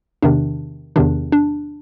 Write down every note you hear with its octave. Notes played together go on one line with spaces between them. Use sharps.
E2 C3 D#3 D4
E2 C3 D#3 D4
D4